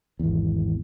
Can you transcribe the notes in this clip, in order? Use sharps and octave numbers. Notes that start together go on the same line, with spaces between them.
G#1 E2